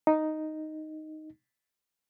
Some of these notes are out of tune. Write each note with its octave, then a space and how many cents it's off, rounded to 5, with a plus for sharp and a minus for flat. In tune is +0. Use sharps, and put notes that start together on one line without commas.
D#4 +0